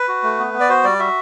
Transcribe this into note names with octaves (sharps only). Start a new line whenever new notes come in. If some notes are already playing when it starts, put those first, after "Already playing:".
Already playing: B4
F#4
A3
B3
B3
D5
F#4 C5
G3 D5
F#4 E5